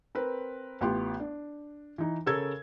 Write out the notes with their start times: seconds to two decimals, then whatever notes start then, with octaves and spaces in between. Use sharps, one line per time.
0.15 C4 A#4 B4
0.81 A1 B3 F4 G4 C6
1.20 D4
1.98 E3 D#4
2.26 C#3 A4 A#4 C#5 E6 G#6